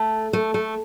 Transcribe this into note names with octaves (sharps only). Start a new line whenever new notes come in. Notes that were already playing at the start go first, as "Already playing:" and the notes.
Already playing: A3
A3
A3